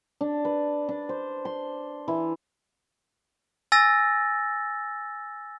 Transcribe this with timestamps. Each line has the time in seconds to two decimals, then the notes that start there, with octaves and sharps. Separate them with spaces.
0.21 D4
0.45 B4
0.89 D4
1.09 C5
1.45 C6
2.08 E3
3.72 G#5 E6 A6 A#6